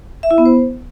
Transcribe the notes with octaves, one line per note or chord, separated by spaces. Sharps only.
E5
E4
B3
C5